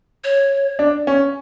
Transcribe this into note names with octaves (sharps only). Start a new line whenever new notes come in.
C#5
D4
C#4